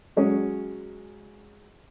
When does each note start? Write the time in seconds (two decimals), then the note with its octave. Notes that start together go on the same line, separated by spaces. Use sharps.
0.17 F#3 G#3 C#4